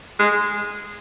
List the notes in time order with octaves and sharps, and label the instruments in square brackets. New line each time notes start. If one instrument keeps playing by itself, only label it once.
[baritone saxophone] G#3